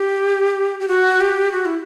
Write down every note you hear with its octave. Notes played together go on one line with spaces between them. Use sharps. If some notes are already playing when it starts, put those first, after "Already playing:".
Already playing: G4
G4
F#4
G4
F#4
E4